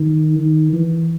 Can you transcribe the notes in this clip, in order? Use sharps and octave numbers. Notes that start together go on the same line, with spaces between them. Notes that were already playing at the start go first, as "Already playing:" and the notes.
Already playing: D#3
D#3
E3